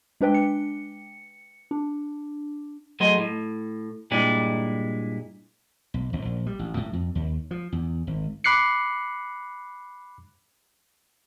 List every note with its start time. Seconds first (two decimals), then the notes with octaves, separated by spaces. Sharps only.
0.21 G#3 D4 B4 G5
0.34 C#7
1.71 D4
3.00 F#3 A3 G#4 D#5 C6
3.18 A2
4.11 G2 A#2 G#3 E4 D5
5.94 B1
6.13 G#1
6.25 A#1
6.47 G3
6.59 A1
6.77 A2
6.93 F2
7.15 D#2
7.51 F3
7.72 E2
8.07 G#1
8.44 B5 D6 F#6 C7 C#7